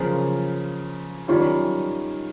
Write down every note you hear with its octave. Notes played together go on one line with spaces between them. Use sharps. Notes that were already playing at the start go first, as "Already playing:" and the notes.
Already playing: C#3 F3 A#3 F4
D#3 G3 C#4 F4